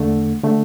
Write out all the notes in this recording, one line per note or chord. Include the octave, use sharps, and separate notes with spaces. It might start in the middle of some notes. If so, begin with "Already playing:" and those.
Already playing: E2 D3 A3
D3 A3